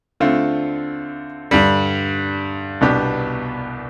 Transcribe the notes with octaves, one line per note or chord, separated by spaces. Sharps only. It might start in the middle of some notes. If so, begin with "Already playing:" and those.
D3 A3 C4 F4
G2 D3 G3
C2 B2 B3 D4 G4